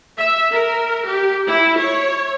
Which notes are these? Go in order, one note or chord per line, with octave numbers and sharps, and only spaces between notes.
E5
A#4
G4
E4
C#5